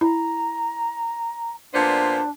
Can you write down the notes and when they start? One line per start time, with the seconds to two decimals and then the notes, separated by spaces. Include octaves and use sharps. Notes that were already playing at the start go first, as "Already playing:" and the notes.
0.01 E4 A#5
1.73 A#2 B3 D4 C5 D5